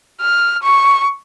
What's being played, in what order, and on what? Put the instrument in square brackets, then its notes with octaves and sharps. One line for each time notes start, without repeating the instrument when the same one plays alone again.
[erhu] F6
C#6